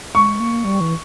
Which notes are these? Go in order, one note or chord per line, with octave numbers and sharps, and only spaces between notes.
G#3 C#6
A#3
G3
E3